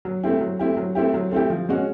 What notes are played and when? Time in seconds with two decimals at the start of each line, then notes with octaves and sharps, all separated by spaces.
0.05 F#3
0.23 A3 C4 E4 G4
0.41 F#3
0.59 A3 C4 E4 G4
0.77 F#3
0.95 A3 C4 E4 G4
1.14 F#3
1.31 A3 C4 E4 G4
1.50 F3
1.69 G#3 C#4 F#4